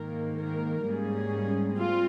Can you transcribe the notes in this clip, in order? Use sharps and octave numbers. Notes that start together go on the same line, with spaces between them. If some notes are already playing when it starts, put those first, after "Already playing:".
Already playing: G#2 D#3 A#3 A#4
A#4
G#2 G3 A#3 C#4 G#4
G3 C4 F4